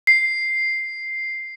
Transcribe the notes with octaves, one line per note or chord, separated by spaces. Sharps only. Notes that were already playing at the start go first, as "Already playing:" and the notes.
C7